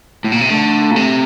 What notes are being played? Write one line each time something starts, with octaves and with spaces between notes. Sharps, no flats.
A2
A#2
C3
D3 A3
A#2
C3